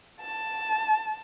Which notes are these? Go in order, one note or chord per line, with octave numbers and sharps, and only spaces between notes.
A5